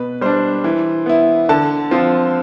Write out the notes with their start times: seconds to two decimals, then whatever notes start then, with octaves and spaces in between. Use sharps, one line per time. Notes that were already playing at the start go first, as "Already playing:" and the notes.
Already playing: B2 B4
0.21 G3 D4 C5
0.64 E3
1.06 B3 E4
1.49 D3 A5
1.91 F3 C4 F4